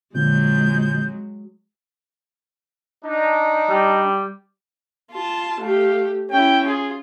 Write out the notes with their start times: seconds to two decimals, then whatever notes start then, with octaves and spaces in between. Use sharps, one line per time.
0.15 F2 A#2 D3 F#3 G#3 G6
3.04 D4 D#4
3.69 G3
5.12 F4 A5
5.61 A3 G4 F5
6.31 C#4 E4 G5
6.67 F4 G#4